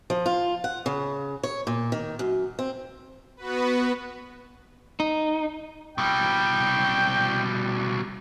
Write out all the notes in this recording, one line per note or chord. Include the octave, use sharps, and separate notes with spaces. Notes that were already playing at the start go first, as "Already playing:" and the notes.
F3
F4
F#5
C#3
C#5
A#2
D#3
F#2
C4
B3 F#4 B4
D#4
B2 G3 G5